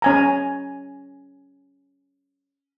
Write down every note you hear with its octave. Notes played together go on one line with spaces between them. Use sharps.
C#4 G#5 A#5